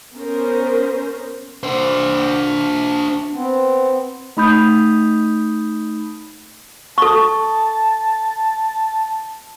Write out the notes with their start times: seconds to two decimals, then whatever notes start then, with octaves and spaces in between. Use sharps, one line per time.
0.15 B3 C#4 A#4 C5
1.63 D4 C5
3.33 B3 C4
4.37 A3 D#4 B5 D#6 G6
6.98 A4 A5 C#6